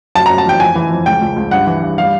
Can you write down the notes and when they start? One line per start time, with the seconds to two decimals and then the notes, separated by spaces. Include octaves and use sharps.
0.15 F#2 A5
0.26 A#5
0.30 F#2
0.38 A5
0.46 E3 G5
0.60 F2 G#5
0.75 E3
0.90 F2
1.06 C#2 G5
1.22 C#2
1.36 C#2
1.51 G2 F#5
1.67 E3
1.82 G2
1.98 G3 F5